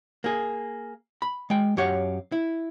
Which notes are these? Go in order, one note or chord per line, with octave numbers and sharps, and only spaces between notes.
A#3 G#4
B5
G#3 G5
F#2 G4 C#5 F5 F#5
E4